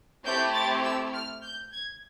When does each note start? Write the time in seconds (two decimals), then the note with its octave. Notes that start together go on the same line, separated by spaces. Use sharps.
0.24 A3 C4 E4 G4 G6
0.54 A6
0.83 E6
1.13 F6
1.43 G6
1.72 G#6